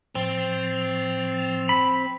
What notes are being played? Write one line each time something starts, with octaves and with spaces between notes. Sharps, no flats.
A2 F3 C4
B5